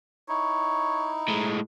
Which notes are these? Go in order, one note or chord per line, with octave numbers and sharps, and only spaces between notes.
D#4 E4 C#5
A2 G#3